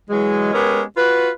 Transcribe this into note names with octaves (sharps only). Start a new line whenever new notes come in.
E3 F#3 G#3
G#3 B3 C#4 G4 A#4
F4 F#4 B4